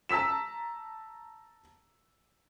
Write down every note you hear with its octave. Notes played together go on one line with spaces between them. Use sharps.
A5 A#5 E6 B6 E7